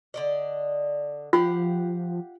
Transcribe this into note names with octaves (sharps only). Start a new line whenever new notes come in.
D3 D5 D#5
F3 F4 G4 F5 F#5